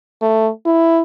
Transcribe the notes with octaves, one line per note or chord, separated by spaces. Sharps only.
A3
E4